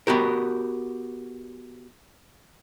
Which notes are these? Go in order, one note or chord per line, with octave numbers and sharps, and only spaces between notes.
B3 F#4 G4 A#4